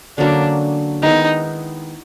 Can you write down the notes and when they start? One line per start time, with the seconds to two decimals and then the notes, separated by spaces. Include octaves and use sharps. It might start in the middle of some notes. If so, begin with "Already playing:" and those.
0.18 D3 F#3 A#3 C#4 D4
1.02 D#3 G#3 B3 D#4 E4